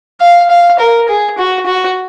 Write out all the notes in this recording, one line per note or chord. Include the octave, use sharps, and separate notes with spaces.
F5
F5
A#4
G#4
F#4
F#4